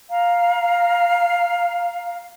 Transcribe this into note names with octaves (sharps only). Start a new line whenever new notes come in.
F5 A#5